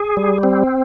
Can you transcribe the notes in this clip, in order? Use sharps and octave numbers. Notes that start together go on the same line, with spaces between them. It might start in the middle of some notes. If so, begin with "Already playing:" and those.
Already playing: G#4
G3
C4